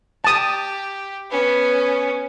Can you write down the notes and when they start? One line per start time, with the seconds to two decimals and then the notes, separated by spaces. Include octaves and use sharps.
0.24 G4 A5 D#6
1.31 B3 C#4